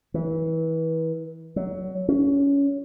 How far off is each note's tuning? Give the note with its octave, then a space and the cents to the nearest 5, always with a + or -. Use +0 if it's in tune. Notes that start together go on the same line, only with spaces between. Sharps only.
E3 -30
F#3 +15
C#4 +20